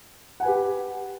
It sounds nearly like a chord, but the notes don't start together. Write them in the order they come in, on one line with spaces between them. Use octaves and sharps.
F#5 G#5 B4 G4